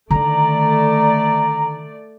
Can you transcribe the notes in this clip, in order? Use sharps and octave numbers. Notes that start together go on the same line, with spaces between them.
D3 D#3 A3 D5 A#5